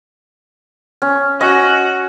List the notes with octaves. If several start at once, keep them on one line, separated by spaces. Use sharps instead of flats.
C#4
C#4 F#4 D#5